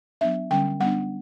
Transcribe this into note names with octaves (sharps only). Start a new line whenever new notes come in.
F#3 B3 D4 E5
D3 G3 C#4 G5
G3 B3 D4 F#5